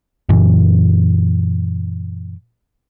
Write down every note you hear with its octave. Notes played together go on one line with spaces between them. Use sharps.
F#2 A#2 E3